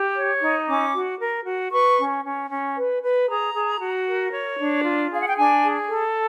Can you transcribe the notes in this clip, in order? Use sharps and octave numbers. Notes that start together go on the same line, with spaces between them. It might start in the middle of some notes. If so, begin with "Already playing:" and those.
Already playing: G4
C#5
D#4
C#4 D6
F#4
A#4
F#4
B4 C#6
C#4
C#4
C#4
B4
B4
G#4 A#5
G#4
F#4
A#4
C#5
D4
F4
G#4 F5
F#5
G5
D4 G#5
G#4
A4